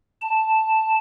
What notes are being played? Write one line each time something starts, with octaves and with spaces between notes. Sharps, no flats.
A5